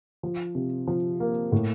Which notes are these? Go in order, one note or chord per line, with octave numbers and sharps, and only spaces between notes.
F3
C3
F3
A#3
A2